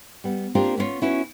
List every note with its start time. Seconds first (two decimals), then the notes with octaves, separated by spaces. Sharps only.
0.24 G3 B3
0.55 A#3 C4 D4 F4 G4 A#4
0.78 B3 C#4 D4 F4 C#5
1.02 C#4 E4 F#4 B4